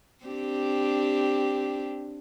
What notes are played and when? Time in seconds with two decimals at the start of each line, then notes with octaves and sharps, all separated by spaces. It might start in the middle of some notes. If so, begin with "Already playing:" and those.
0.25 C4 D4 G4